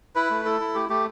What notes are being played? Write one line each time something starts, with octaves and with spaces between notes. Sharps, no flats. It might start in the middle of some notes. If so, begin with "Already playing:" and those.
E4 B4
A3
E4 A4
E4
A3 G4
A3 G4